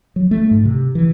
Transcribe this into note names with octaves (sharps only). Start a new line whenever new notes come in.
F#3
A3
G#2
C3
E3